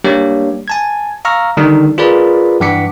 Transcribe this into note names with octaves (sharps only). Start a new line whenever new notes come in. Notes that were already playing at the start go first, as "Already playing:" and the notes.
G3 A#3 D4 G4 C#5
G#5 A5 G#6
F5 A#5 C#6 E6 F6 A#6
D3 D#3 G3 D4 D#4
F4 G#4 A#4 B4 D5 B5
G2 E3 F#5 D6 B6 C#7